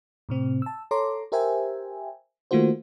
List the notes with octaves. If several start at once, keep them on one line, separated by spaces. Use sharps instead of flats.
A2 C3 C4
A5 E6
A4 C#5 A#5 C6 D6
G4 A#4 C5 E5 G5 G#5
D#3 A3 A#3 F4 F#4 C5